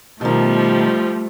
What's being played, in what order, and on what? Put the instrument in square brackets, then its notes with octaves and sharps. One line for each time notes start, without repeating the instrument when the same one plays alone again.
[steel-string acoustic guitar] B2 D#3 [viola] F3 G3 [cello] A3